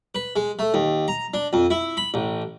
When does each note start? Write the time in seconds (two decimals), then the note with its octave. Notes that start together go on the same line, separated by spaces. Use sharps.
0.15 B4
0.36 G#3
0.59 A3
0.74 D#2
1.08 A#5
1.34 D4
1.53 F2
1.70 E4
1.97 B5
2.14 A1